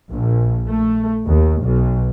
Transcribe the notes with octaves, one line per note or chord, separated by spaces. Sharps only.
A#1
A3
D#2
B1